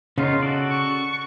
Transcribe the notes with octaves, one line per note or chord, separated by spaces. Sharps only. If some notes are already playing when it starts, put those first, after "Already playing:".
C#3 B3 D#4 F4
F#4 A4 D5
C#6